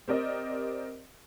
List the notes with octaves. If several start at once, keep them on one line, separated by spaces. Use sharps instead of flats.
C4 G4 A#4 D5 D#5